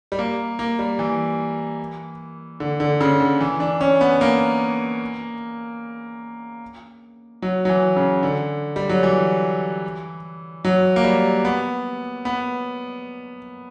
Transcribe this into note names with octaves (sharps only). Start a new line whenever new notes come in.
G3
A#3
A#3
G3
E3
D3
D3
C#3
D3
E3
D4
C#4
B3
A#3
F#3
F#3
E3
C#3
D3
G3
F#3
E3
F#3
A#3
G3
B3
B3